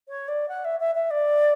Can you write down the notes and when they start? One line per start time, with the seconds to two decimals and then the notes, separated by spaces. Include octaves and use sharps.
0.09 C#5
0.28 D5
0.48 F#5
0.64 E5
0.80 E5
0.95 E5
1.10 D5